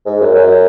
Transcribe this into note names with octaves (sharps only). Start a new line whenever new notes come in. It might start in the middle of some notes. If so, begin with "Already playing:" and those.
G#2
F#2
F#2